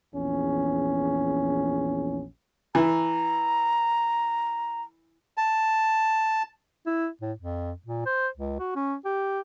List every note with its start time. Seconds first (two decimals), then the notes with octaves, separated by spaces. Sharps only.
0.15 A#1 E2 C#4
2.75 E3 A#5
5.37 A5
6.86 E4
7.21 A2
7.39 F2
7.86 A#2
8.06 C5
8.37 C#2
8.59 F#4
8.76 C#4
9.05 G4